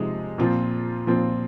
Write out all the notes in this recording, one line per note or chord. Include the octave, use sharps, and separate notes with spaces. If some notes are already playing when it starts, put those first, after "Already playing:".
Already playing: C3 F3 G#3 D#4 G#4
A#2 F3 C4 F4
A#2 F3 C4 F4